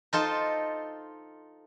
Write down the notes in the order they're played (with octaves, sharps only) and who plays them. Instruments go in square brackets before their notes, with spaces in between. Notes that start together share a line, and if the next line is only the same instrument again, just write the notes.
[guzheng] D#4 F4 A4 C5